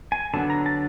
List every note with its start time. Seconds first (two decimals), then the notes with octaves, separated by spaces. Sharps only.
0.12 G#5
0.34 D3 F#3 B3 D4 A5
0.50 A#5
0.66 A5